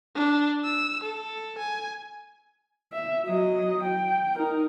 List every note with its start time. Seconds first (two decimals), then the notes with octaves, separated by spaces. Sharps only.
0.15 D4
0.64 E6
1.04 A4
1.59 G#5
2.93 E5
3.26 F#3 D#5
3.83 G5
4.37 D#4 A#4